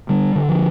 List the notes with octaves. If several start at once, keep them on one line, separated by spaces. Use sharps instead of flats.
D3 G3
D3
F3